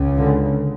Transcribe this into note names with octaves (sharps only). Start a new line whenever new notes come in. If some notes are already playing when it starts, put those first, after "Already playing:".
Already playing: C#2 C#3
D3